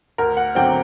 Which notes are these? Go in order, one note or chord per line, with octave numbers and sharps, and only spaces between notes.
D2 A#4
F#5
D3 F#3 C4 G5